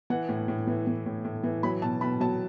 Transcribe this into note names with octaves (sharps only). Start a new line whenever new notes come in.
E3 F#5
A2
A2
E3
E3
A2
A2
E3
F#3 B5
B2 A5
B2 B5
F#3 A5